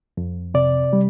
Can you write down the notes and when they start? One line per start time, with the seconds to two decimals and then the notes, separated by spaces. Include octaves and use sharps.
0.17 F2
0.54 C3 D5
0.93 G3